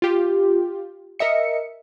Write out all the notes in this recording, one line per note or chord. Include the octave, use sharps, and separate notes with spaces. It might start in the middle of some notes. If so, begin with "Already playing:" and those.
F4 G4
A#4 D#5 E5 C#7